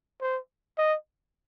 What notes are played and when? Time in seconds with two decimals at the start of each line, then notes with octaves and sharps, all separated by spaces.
0.21 C5
0.78 D#5